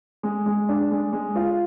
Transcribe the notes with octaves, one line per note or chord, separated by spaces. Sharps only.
G#3
G#3
D4
G#3
G#3
F4